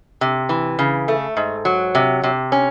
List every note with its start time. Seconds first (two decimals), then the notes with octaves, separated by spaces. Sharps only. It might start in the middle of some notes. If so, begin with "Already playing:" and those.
0.21 C3
0.49 E3
0.79 C#3
1.08 A3
1.37 G#2
1.65 F#3
1.95 C3
2.24 C3
2.52 C#4